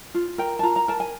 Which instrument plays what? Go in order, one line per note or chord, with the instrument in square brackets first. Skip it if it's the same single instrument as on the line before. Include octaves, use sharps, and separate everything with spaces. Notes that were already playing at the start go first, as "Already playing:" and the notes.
[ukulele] F4
A#4 G5
A5
F4 A#5
A#5
A#4 A5
G#5